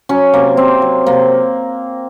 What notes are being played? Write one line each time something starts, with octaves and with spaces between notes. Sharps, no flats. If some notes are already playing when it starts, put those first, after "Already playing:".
F#3 C#4
C3 A#3
C3 C4
F#3
C3 A#3